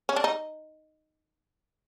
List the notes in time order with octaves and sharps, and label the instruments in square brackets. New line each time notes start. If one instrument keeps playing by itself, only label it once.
[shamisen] C#4
D4
D#4